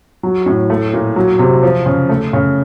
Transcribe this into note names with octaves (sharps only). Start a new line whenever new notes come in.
F#3
A2
A3
A#2
F#3
C3
F3
C#3
A3
C#3